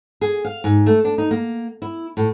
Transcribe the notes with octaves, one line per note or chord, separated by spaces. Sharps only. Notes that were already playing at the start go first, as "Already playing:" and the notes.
G#4
F5
G#2
A3
D4
D#4
A#3
E4
A2